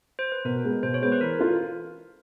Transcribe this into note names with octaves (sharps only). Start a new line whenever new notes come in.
C5
B4
B2 A#4
G#3 B3
B2 C5
C#5
G#3 B3 C5
B4
E3 A#4
F4 A4